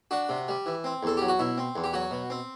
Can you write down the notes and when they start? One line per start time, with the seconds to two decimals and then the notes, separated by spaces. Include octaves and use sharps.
0.11 D4 F#4
0.29 C3
0.48 G3
0.66 E3
0.84 C4
1.03 E2 A4
1.17 F#3 G4
1.28 F#4
1.39 B2 E4
1.58 C4
1.76 E2
1.84 G4
1.93 F#3 F#4
2.11 B2
2.30 C4